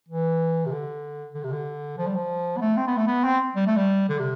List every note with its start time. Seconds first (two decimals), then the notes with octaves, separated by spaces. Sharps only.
0.09 E3
0.66 C3
0.72 D3
1.35 D3
1.44 C3
1.52 D3
1.98 F3
2.07 G3
2.15 F3
2.57 B3
2.61 A3
2.77 C4
2.87 B3
2.97 A3
3.07 B3
3.24 C4
3.56 G3
3.66 A3
3.77 G3
4.09 D3
4.19 C3